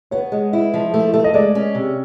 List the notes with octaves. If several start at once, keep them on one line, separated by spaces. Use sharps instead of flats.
B3 C#5
G#3
E4
F3
A3
A3
D#5
G#3 D5
C#4
C3